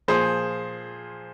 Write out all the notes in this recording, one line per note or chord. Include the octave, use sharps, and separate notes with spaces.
A#2 F3 G#4 C5